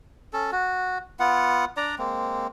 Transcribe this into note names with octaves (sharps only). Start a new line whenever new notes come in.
C#4 A4
F#4
B3 F4 F#5
D4 D5 A#5
G#3 A#3 C4